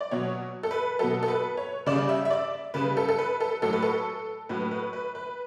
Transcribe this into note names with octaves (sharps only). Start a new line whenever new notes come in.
D5
B2 F#3 C#5
A4
B4
B2 F#3 A4
A4
B4
C#5
C#3 G3 D5
E5
E5
D5
C#3 G3 B4
A4
A4
B4
A4
A2 F#3 A4
B4
A4
A2 F#3 B4
B4
B4
B4